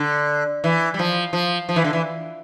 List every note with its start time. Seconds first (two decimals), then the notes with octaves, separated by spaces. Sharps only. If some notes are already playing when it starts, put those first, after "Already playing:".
Already playing: D3
0.64 E3
0.94 G3
0.99 F3
1.33 F3
1.69 F3
1.76 E3
1.84 D3
1.93 E3